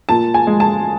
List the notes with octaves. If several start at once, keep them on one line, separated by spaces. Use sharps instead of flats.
A#2 A5
G#5
G#3
A5